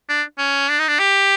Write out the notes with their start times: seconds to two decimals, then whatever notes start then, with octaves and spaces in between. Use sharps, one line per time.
0.09 D4
0.38 C#4
0.69 D4
0.79 D#4
0.88 D4
0.99 G4